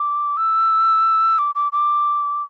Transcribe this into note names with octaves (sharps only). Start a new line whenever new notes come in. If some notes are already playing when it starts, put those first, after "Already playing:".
Already playing: D6
E6
D6
D6
D6